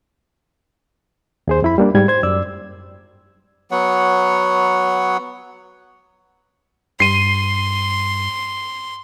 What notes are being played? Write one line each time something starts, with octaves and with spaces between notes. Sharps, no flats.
D#2 G#4 C5
F2 E4 B5
G3 A#3 D4
G#2 G3 G#6
C5 G#6
F#2 D5 E6
F#3 B3 C#5 F#5
G2 C6 C7 D#7